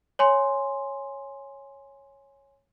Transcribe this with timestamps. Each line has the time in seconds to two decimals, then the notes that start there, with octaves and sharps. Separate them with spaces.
0.19 C#5 G#5 C6